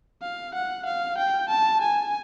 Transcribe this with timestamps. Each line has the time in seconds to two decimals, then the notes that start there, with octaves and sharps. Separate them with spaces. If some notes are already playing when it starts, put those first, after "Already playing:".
0.22 F5
0.55 F#5
0.86 F5
1.18 G5
1.49 A5
1.82 G#5